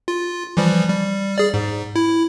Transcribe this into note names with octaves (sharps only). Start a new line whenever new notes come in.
F4
E3 F3 G3
G3
G#4 D5
G#2
E4